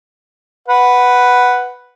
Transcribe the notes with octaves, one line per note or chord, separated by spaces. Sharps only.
B4 F#5